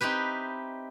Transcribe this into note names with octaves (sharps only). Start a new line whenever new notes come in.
C4 D#4 E4 G4 B4